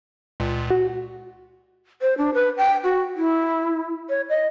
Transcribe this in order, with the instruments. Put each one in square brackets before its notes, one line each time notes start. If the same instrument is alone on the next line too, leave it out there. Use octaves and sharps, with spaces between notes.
[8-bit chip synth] C#2 A#2
[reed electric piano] F#4
[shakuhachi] C5
D4
B4
G5
F#4
E4
C#5
D#5